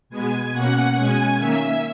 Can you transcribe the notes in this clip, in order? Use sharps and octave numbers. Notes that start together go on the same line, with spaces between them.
B2 G#3 B3 G#5
B2 A#3 C#4 F#5
B2 G#3 C#4 G#5
D#3 A#3 C#4 E5